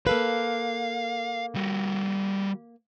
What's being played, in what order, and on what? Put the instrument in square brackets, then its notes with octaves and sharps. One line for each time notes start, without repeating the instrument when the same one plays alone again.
[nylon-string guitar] A#3 A4 B4 [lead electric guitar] F5
[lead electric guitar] G3 F#4